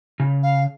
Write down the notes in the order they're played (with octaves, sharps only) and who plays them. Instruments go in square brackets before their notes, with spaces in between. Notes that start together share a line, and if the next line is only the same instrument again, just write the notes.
[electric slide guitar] C#3
[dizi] F5